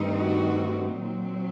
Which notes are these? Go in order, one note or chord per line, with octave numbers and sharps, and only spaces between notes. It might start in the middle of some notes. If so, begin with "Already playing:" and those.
Already playing: G2 D#3 A3 C4 D#4
F#4
A#2 F#3 C4